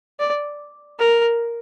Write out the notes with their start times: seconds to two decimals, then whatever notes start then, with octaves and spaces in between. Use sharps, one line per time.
0.19 D5
0.99 A#4